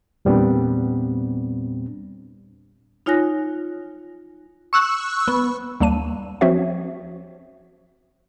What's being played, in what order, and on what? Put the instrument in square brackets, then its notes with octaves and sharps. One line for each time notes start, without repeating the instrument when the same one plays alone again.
[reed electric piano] E2 A#2 G3 B3 C4 D4
[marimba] D#4 F4 C#5 G#5 F#6 A#6
[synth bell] C#6 E6 F#6
B3
[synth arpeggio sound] D#2 G3 A#3 A5 D#7
F3 C4 C#4 F#4 C#5 E5